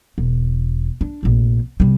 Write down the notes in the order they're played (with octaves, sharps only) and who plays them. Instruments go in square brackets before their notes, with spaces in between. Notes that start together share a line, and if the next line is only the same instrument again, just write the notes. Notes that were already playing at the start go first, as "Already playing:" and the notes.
[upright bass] E1
D4
F1 A#1
C3 G3